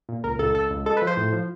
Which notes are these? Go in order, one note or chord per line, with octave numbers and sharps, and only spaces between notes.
A#2
C#2 A#4
C#2 A4
C#2 A4
C#2
G#3 A4
B4
F3
C5
A2
F3